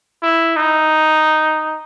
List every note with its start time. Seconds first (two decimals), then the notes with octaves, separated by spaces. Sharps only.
0.23 E4
0.56 D#4